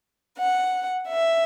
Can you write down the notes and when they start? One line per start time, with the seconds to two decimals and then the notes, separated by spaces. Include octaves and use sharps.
0.37 F#5
1.08 E5